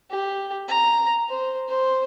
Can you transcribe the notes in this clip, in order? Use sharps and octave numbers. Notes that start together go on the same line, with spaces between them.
G4
A#5
C5
C5